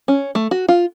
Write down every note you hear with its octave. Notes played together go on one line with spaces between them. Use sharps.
C#4
A3
F#4
F4